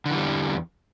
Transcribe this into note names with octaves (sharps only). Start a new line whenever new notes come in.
E2 D3 E3 G3